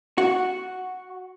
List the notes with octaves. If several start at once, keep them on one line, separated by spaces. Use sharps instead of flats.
F#4